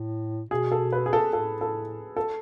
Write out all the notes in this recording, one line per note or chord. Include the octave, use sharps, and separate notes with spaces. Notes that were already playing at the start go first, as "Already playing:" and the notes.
Already playing: A2
B2 G#4
A4
B4
G#4
A4
A2 A4
A4
A4